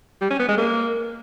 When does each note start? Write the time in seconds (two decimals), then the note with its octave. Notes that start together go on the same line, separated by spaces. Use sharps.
0.21 G3
0.30 C#4
0.39 B3
0.48 G#3
0.57 A#3